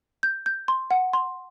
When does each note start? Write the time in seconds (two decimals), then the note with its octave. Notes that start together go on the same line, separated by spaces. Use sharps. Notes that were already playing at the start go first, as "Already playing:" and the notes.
0.23 G6
0.46 G6
0.68 C6
0.91 F#5
1.13 C6